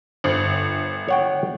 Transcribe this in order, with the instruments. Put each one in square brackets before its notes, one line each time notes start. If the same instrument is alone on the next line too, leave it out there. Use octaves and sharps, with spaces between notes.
[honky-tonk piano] G1 [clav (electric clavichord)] C5
[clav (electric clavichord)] C#5 F#5 G5